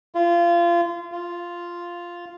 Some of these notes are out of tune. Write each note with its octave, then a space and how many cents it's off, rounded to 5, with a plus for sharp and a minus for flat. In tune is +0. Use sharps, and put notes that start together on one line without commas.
F4 -25
F4 -5